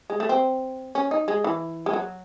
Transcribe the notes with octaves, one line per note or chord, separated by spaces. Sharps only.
G#3
A3
C4
C#4
D#4
G#3
E3
G#3
F#3